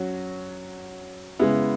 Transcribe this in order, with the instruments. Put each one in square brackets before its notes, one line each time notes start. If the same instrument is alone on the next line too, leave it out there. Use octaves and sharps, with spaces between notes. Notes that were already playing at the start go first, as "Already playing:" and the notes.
Already playing: [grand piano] F#3 C#4 F#4
C#3 G#3 B3 E4